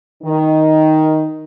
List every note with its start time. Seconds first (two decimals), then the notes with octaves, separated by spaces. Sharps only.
0.23 D#3